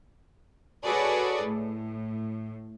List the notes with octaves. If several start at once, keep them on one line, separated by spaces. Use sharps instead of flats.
F#4 G#4 A4 B4 C#5 D5
A2